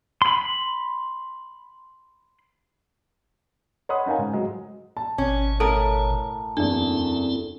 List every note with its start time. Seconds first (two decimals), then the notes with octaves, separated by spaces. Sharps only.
0.22 B5 C6
3.89 C#5 D#5 F#5 B5 C6 D#6
4.06 C#4 D#4 A#4 F5 G#5
4.18 G#2
4.33 G#2 F#3 G#3
4.97 A5
5.18 G#1 B2 C#4 C#5
5.60 A2 A4 A#4
6.57 F#1 E2 C4 D4 E4 A4